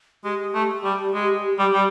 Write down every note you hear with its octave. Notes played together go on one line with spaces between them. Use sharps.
G#3 G4
A3
G3
G#3
G3
G3